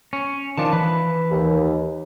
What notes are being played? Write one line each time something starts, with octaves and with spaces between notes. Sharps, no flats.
C#4
D#3 F3 D4 A5
E3 B4
D#2